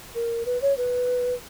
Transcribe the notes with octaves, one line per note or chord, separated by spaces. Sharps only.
A#4
B4
C#5
B4